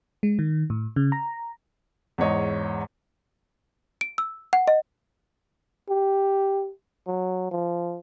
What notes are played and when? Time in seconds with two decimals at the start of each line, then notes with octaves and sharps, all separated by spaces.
0.23 G#3
0.39 D#3
0.70 A2
0.96 C#3
1.12 A#5
2.18 E2 G#2 C#5 D#5
4.01 D7
4.18 E6
4.53 F#5
4.68 D#5
5.90 G4
7.07 F#3
7.51 F3